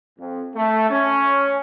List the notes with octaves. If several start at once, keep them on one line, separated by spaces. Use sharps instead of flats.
F2
A3
C#4